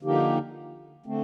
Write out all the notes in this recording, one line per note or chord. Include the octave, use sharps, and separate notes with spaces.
D3 F3 A#3 D#4 G4
D3 A3 C4